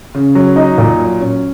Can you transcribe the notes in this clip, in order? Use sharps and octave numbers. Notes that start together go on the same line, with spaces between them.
C#3
F#3
D#4
A#2
F#3
C#4